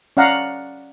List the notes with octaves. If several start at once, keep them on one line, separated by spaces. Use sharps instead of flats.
C#4 D5 F5 F#5 A#5